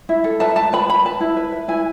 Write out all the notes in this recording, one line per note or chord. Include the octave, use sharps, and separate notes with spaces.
E4
A4
B4 A5
B4 A5
B4 B5
B4 B5
B4 A5
E4
B4
B4
E4 G#5